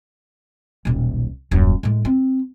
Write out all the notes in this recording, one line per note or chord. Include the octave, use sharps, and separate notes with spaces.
D#1 B1
D#1 F#2
A2 G#3
C4